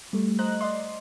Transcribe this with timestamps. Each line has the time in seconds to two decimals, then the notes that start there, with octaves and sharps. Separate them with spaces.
0.13 G3 A3
0.39 C5 D#5 A#5 F#6
0.61 D5 D#5 C6